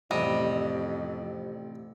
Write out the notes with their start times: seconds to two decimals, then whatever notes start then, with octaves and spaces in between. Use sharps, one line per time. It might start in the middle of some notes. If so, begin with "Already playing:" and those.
0.11 A1 F2 C3 G3 D#5